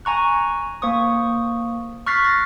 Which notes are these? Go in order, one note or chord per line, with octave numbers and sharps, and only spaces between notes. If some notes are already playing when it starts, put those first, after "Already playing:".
G#5 A#5 C#6 F#6
A#3 C5 C#6 D#6
C#6 F6 F#6 A6 B6 C7
A6 A#6